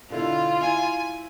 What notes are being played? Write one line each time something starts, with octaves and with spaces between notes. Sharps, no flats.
B2 D3 E4 F4
E4 G#5